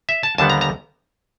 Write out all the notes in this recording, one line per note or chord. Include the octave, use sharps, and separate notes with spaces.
E5
A5
D#2 D3 G3 B3 A5
A#5
A#5